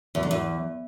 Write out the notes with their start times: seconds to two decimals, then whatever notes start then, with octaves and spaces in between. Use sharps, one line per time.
0.15 E2
0.23 D3
0.31 E2